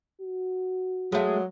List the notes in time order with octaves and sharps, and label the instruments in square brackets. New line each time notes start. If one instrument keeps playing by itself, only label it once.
[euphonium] F#4
[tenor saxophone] F#3 [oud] G#3 A3